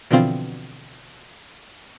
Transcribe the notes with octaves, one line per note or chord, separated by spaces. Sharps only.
B2 D3 E3 F3 C4 F4